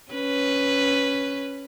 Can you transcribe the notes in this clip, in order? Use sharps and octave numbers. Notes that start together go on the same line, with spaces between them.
C#4 B4